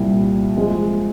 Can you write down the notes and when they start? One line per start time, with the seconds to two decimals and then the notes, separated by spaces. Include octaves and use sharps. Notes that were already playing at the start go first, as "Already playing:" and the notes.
Already playing: C2 A#2 G3
0.57 F3 G#3